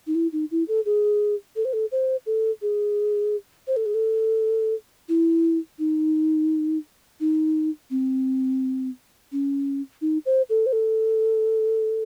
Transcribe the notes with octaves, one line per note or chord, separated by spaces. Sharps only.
D#4
E4
D#4
E4
A4
G#4
A4
C5
A4
C5
A4
G#4
C5
A4
G#4
A4
E4
D#4
D#4
C4
C#4
D#4
C5
A4
C5
A4